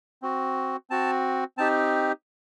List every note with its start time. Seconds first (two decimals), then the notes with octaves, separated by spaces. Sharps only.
0.22 C4 F#4
0.90 C4 F#4 A5
1.57 C4 D#4 G4 A5